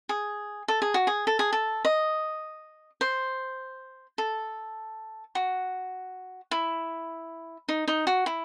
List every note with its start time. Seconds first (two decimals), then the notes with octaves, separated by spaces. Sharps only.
0.09 G#4
0.68 A4
0.82 G#4
0.94 F#4
1.07 G#4
1.27 A4
1.39 G#4
1.53 A4
1.85 D#5
3.01 C5
4.18 A4
5.35 F#4
6.51 E4
7.69 D#4
7.88 D#4
8.07 F#4
8.26 E4